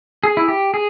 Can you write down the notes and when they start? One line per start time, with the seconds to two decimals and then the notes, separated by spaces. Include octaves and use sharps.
0.24 G#4
0.37 E4
0.48 G4
0.74 G#4